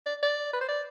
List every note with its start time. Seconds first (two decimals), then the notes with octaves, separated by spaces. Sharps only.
0.06 D5
0.23 D5
0.53 B4
0.61 C5
0.69 D5